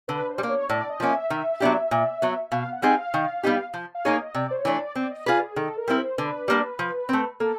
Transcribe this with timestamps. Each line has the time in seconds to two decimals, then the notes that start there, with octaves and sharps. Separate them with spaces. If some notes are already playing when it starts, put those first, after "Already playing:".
0.08 D3 B4
0.29 C5
0.38 G3
0.43 A#3
0.49 C#5
0.70 A2 D5
0.89 D#5
1.00 F3 A#3 C#4
1.10 E5
1.30 D#3
1.60 F#3 B3 D4 G4
1.91 A#2
2.22 F#3 B3
2.52 B2 F5
2.73 F#5
2.82 G3 C4 D#4 G#4
2.93 F5
3.14 D#3
3.43 G3 B3 D#4 G4
3.74 F3
3.95 F5
4.05 A#3 D#4 G#4 C#5
4.15 D#5
4.35 C3 D5
4.51 C5
4.55 C#5
4.65 E3 A3 D4
4.76 D5
4.96 C4 D5
5.11 D#5
5.26 F4 G#4 B4 D5
5.41 G#4
5.56 D#3 A4
5.77 A#4
5.88 G3 C4 E4
5.98 C5
6.18 D3 B4
6.48 G3 A#3 D4
6.79 F3
7.09 A3 C4
7.40 A#3 A4